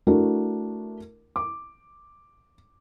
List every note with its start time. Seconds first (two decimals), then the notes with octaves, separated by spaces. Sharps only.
0.07 A3 D4 E4 F#4 A#4
1.36 D6